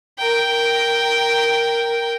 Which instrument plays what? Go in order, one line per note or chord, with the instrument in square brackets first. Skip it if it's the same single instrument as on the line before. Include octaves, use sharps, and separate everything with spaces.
[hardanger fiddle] A#4 G5